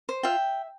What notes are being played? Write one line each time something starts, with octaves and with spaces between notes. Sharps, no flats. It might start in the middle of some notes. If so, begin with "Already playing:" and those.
C5
F4 E5 G5